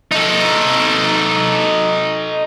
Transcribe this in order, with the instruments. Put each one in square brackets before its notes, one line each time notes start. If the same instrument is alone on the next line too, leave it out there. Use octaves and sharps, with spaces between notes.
[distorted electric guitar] D#4 A4